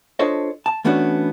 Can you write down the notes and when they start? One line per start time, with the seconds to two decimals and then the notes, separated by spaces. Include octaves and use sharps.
0.19 D4 F4 A4 C5 C#5 D#5
0.66 A5
0.85 E3 A3 B3 C#4 D4 F#4